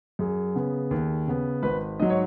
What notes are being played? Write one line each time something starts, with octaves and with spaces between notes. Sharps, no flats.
F#2 G#4
C#3 B3
D#2
C#3 B3
G#1 B4
G#2 F#3 D#5
C#5